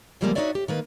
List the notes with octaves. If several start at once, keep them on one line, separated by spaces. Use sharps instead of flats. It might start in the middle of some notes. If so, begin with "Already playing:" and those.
C#3 E3 F3 G3 G#3 A#3
D#4 F4 F#4 C#5 D5 E5
G4
D#3 A#3 B4